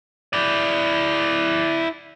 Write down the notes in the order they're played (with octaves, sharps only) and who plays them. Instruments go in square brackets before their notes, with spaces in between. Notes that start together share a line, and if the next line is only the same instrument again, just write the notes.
[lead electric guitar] E4 D5